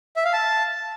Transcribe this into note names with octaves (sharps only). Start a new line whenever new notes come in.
E5
F5
A5